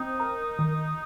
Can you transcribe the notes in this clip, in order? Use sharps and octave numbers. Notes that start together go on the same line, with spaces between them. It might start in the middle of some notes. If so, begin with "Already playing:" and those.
Already playing: C4 D#4
A#4
D#3